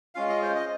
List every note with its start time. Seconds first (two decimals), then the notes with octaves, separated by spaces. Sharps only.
0.15 G#3 C#4 F4 F5
0.29 D#5
0.42 C5
0.56 D#5